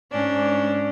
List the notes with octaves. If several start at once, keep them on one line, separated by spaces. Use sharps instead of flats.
G#2 C#4 D4